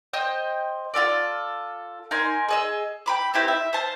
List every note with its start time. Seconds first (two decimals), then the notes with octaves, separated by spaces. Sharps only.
0.13 C5 D#5 G5
0.94 F4 G4 A4 D5
2.11 D#4 A#4 G#5 C6
2.49 G#4 D#5 E6
3.06 G5 B5 D6
3.34 C4 E4 G4 B4
3.48 E5
3.73 C5 F5 A5